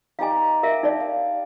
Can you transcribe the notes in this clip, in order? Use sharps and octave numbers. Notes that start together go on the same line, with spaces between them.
D#4 G4 D5 F5 G#5
A#4 E5 F5 D6
D#4 C#5 D5
F5